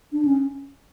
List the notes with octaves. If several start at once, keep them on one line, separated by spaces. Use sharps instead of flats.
D4
C#4